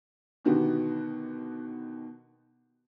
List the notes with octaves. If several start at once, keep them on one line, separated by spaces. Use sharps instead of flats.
B2 D3 D#3 B3 F#4 G4